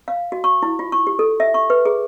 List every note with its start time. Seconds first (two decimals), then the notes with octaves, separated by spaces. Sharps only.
0.08 F5
0.32 F#4
0.44 C#6
0.63 E4
0.79 F4
0.92 C#6
1.07 G4
1.19 A4
1.40 E5
1.54 C#6
1.70 B4
1.85 G#4